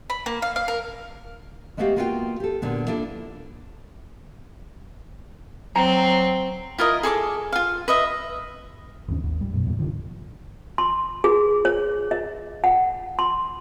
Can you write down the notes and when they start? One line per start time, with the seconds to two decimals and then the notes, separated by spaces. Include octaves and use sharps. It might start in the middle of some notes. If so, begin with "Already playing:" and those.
0.10 B5
0.26 A#3
0.42 F5
0.56 F5
0.68 A#4
1.77 G#3 A3 B3 F#4 G4 F5
1.96 A#3 B3 F4 F#4 F5 G5
2.40 G4 A4
2.62 A#2 D3 B3
2.87 A#3 D4 E4 F4 A4
5.76 F#3 C4 A#5
6.78 E4 F4 A#4 D#5
7.03 G#4 A4 C6 D6
7.53 F4 F5
7.88 B4 D#5 E5
9.08 G1 D#2 C#4
9.24 G#1 D#2
9.41 G3
9.53 F#2 B2
9.66 E2 A2 G3 A#3
9.79 G#1 D3 D#3 F3
10.78 C6
11.24 G#4
11.65 C#5
12.11 D#5
12.64 F#5
13.19 C6